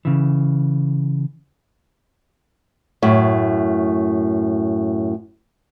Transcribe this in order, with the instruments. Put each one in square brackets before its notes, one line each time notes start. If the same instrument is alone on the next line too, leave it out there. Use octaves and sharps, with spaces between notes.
[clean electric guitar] C#3 E3
[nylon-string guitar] F#2 A2